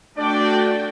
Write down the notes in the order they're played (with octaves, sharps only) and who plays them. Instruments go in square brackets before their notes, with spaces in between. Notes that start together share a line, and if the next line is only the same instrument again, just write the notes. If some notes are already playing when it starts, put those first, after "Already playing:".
[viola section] A3 F#4 G5 [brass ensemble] D4 D5